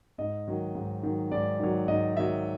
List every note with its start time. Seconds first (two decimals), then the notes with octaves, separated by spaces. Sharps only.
0.18 G#2 D#5
0.48 D#3 F#3
0.75 G#2
1.03 D#3 F#3
1.31 G#2 D5
1.60 D#3 F#3
1.88 G#2 D#5
2.16 D#3 F#3 E5